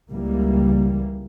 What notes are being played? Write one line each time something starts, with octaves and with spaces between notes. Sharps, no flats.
C#2 E3 G3 A#3